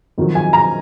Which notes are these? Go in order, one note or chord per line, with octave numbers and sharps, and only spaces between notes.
F2 D#3 F#3
G#5
A#5